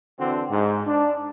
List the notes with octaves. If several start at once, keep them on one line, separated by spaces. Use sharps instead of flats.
D3 E3 C4 D4 F#4
G#2
D4